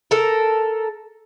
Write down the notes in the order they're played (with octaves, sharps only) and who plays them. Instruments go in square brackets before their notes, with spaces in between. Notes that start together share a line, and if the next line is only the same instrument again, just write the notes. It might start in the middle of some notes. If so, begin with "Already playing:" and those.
[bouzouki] A4 A#4